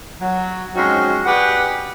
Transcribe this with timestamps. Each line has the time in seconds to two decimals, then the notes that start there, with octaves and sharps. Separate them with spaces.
0.21 F#3
0.75 F3 G#3 C4 C#4 D#4 F#4
1.25 G4 G#4 B4 D5 F#5